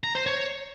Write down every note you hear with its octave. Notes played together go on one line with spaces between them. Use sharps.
A#5
C5
C#5